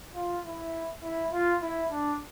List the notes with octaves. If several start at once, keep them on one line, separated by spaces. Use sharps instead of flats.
F4
E4
E4
F4
E4
D4